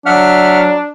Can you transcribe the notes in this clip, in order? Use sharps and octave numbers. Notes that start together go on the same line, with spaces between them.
F#3 D4 E5 F#5 F6